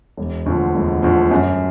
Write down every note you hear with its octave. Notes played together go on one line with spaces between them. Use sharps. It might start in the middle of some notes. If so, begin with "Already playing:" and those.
E1
D2 D3 F3
E1
D2 D3 F3
F#2